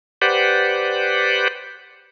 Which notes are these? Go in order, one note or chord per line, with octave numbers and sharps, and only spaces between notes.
G4 B4 C5 D5 F#5